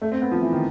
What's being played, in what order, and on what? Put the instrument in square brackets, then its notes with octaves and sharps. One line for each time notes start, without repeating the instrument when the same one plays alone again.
[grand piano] A3
C4
B3
F3
E3
D#3